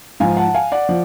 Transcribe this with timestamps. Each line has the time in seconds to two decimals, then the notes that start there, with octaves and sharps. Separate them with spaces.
0.20 G#2 F3 F5 G#5
0.37 F#5 A5
0.54 F5 G#5
0.72 D5 F#5
0.89 F3